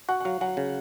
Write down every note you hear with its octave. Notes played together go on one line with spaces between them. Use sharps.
F#4 F#5
F#5
F#3 F5
F#3 F#5
C#3